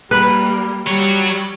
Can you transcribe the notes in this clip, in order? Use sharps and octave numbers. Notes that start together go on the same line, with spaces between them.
G3 A#3 B4
F#3 G3 C#5